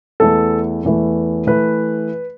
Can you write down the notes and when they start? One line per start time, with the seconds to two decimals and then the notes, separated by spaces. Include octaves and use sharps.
0.20 E2 E3 A3 A4
0.83 E2 E3 A3
1.47 E3 A3 B4